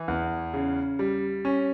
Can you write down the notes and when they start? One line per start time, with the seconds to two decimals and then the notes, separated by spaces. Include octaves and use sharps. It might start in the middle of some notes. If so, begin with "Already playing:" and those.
Already playing: E3
0.08 E2
0.54 C#3
0.99 G3
1.45 C#4